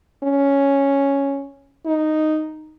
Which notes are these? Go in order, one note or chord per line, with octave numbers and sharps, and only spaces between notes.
C#4
D#4